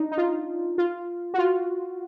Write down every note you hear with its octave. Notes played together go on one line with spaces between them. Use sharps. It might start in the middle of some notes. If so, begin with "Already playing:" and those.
Already playing: D4 D#4
D#4
F4
F4
F#4
F4